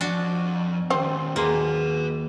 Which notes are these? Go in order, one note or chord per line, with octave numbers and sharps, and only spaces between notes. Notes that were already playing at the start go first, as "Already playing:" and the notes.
F2 D4 F#4
D#3 C4 C#4 G4
D#2 A#3 G#4 B4 D#5 C6